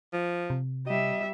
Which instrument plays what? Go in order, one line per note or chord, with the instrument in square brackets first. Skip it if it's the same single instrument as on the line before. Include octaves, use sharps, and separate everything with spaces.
[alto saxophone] F3
[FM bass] C3
[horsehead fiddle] G3 E5 [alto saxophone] D#5